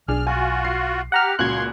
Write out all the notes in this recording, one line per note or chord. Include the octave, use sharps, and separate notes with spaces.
B1 D4 G#4 F6
F4 F#4 G#5
C7
G4 F#5 A#5 F6
C#2 A#2 F#4 C6 F#6 G#6